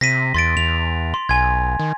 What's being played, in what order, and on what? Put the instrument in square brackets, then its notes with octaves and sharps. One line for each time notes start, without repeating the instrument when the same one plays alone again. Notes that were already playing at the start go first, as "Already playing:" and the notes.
[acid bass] C3 [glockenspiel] A#6 B6 D#7
[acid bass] E2 [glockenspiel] C6 A6 D7
[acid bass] E2 [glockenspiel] F7
[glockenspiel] C6
[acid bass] B1 [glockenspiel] G#5 C6 G#6
[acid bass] D#3